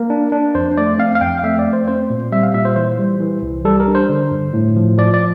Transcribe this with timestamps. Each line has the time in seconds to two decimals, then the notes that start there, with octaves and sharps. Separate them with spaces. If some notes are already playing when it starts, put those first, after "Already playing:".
Already playing: A#3 A#4
0.10 D4
0.32 D4
0.55 F2 C5
0.78 A3 D5
0.99 C4 F5
1.15 F5
1.21 F2 G5
1.39 F5
1.44 A3 E5
1.59 D5
1.66 A3
1.73 C5
1.88 C4 C5
2.10 A#2
2.32 G3 E5
2.43 F5
2.54 A#2 E5
2.65 C5
2.76 E3 C5
2.99 G3
3.20 E3
3.42 C2
3.65 G3 A4
3.80 A#4
3.88 D4
3.95 C5
4.09 D3
4.31 G2
4.53 A2
4.76 F3
4.98 F3 D5
5.14 D5